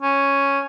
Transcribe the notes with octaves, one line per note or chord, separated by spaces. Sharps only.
C#4